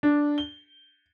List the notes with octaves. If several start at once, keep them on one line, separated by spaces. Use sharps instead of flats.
D4
G7